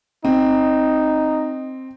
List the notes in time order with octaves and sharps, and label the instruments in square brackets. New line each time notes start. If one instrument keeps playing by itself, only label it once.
[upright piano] C4 [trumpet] D#4